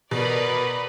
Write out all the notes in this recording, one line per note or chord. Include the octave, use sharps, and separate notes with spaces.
B2 A#4 B4 D5